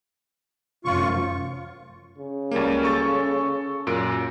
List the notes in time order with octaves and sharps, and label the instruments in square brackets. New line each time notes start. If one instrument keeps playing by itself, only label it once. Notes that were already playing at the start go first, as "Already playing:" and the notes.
[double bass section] F1 F#2 F3 [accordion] F4 C#6
[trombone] C#3
[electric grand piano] C#2 G3 A#3
A4 C#6 A6
F#2 A#2 D7